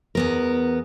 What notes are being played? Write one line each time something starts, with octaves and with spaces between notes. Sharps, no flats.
E2 B3 A#4